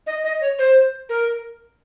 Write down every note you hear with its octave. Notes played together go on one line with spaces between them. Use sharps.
D#5
D#5
C#5
C5
A#4